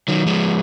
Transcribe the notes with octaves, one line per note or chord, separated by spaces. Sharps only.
D#3 F#3
F3 G#3